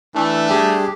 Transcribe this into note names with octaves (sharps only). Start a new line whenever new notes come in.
E3 A3 D4
G3 G4 G#4